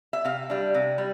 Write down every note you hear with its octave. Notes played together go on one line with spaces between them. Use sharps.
E5
C3 F5
G3 D4
C3
G3